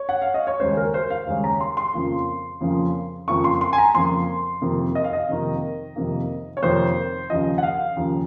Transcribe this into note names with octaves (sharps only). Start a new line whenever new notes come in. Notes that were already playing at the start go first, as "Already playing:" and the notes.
Already playing: C#5
F#5
F5
D#5
C#5
D#2 C#3 G#3 C#4 C5
A#4
C5
F5
D#2 C#3 G#3 C#4
A#5
C6
C6
F2 C#3 F3 A#3
F2 C#3 F3 A#3
F2 C#3 F3 A#3 C#6
C6
C6
G#5
A#5
F2 C#3 F3 A#3 C6
F2 C3 D#3 A#3
D#5
F5
D#5
F2 C3 D#3 A#3
F2 C3 D#3 A#3
C#5
F2 C3 D#3 A#3 C5
D#2 C#3 F3 D#5
F#5
F5
D#2 C#3 F3